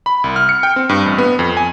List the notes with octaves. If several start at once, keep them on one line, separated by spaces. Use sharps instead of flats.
B5
C2
F6
C#7
G5
C4
G2
A1
B3
F2
G#5